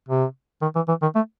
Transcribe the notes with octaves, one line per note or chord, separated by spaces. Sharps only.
C3
D#3
E3
E3
D#3
A3